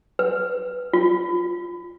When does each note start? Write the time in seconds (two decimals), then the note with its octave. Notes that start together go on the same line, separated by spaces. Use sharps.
0.19 B4
0.93 F4